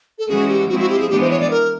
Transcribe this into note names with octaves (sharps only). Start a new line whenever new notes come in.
A4
E3 G#3 C#4 F#4 G#4
G4
F3 G#3 C4 E4 F#4
F#4
G4
G#4
E3 G#3 B3 D4 G4
C5
C#5
D5
A#4